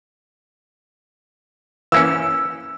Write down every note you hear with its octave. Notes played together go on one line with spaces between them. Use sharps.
E3 A#3 C#4 E6